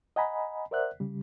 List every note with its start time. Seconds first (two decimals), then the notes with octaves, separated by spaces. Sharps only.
0.16 D#5 F#5 G#5 A#5 B5
0.71 A#4 C5 D5 E5 F#5 F#6
1.00 C#3 G3